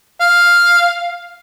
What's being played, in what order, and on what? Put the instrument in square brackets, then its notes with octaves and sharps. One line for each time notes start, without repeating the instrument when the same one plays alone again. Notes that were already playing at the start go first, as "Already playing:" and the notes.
[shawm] F5